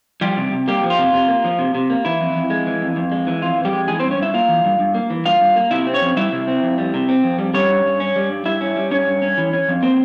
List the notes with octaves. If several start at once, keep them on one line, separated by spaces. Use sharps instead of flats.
F3 G3 G4
C3
C3
G3 A#3 G4
F3
F4
C3
C3
A#3
F3
C3
C3
A#3
E3 E4
F2
F2
G#3
E3
F2
F2
G#3
E3
F2 F4
F2
G3 G4
G#3
E3 G#3 G#4
C4 C5
G2
C#4 C#5
G2 E4 E5
A#3 F4 F5
E3
G2
G2
A#3
E3
G2 F4 F5
G2
A#3
C3 E4 E5
C4
C#4 C#5
F2
G3 E4 E5
C3
C4
F2
G3
C3
C4
F2
G3
G3 C#4 C#5
G2
G2
C#4
G3
G2
G2 E4 E5
C#4
G3
G2 C#4 C#5
G2
C#4
E3
C#4
F2
A#3 C4 C5